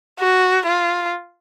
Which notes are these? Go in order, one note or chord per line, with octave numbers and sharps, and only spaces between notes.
F#4
F4